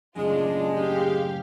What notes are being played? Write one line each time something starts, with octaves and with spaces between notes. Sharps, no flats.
F#2 A2 C#3 G#3 D4 F4
G4 F5